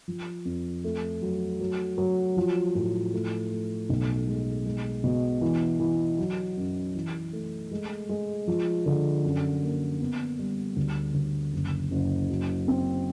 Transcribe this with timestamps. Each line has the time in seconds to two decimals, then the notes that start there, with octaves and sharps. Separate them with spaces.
0.08 F3
0.45 F2
0.84 A3
1.22 F#3
1.60 F#3
1.98 F#3
2.37 F3
2.75 A2
3.13 A3
3.51 A3
3.89 B1
4.28 G#3
4.65 G#3
5.04 B2
5.41 E3
5.80 E3
6.18 F#3
6.57 F#2
6.94 E3
7.33 A3
7.71 G#3
8.09 G#3
8.47 F3
8.86 D3
9.24 F#2
9.62 A#3
10.00 B3
10.39 G3
10.76 D2
11.14 D2
11.53 F#1
11.91 F#1
12.30 F#3
12.68 C4